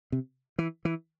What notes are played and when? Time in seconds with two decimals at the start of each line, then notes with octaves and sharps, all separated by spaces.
0.12 C3
0.58 E3
0.85 E3